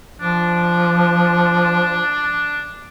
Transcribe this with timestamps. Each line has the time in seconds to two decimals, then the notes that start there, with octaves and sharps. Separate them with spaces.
0.21 F3 D4